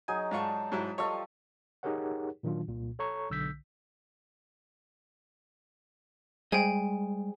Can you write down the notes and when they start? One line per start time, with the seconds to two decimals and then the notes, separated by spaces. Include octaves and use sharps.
0.08 F#3 D#4 G#4 G#5
0.31 G#2 F4 D5 A5 C#6
0.72 G#2 F#3 E4
0.98 F3 G3 A4 C#5 D#5 F5 C#6
1.83 D#4 G4 G#4 A#4 C#5 F#5
2.43 A#2 D#3 F#3 D4 F4
2.68 C2 A#2
2.99 A4 C#5 A#5 C#6
3.30 B1 D3 E6 G6 B6
6.52 G3 G#3 G#4 C5 D#5 G5 G#5